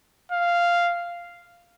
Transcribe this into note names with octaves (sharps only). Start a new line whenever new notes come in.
F5